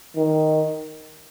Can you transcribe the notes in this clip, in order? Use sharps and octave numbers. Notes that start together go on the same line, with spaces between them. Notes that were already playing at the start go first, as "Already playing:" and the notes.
D#3